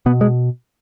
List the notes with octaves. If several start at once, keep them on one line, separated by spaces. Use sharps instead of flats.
B2 B3
G#3